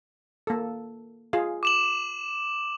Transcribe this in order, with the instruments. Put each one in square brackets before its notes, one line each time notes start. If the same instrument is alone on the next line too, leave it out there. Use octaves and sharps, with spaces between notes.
[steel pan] A#3 A4
F4 G#4 F5
[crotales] D6 E7 F#7